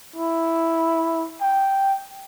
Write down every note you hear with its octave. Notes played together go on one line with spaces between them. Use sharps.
E4
G5